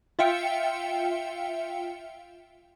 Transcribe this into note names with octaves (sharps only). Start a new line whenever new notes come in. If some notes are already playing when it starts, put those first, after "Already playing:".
F4 E5 F5 G5 C#7